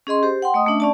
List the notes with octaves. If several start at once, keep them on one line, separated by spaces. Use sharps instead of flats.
C#4 G#4 D#5 C6
G4 C5
F#5 G5 C6
A3 D#5 D#6
A3 C#4 D4 E5
C#4 D5 A5